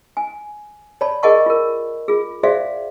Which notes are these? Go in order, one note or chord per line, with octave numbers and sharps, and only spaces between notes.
G#5
C#5 D5 A5 B5
G#4 A#4 D#5 F#5 A5 C#6
F4 A#4
F4 G#4
F#4 G#4 C5 D5 E5 F5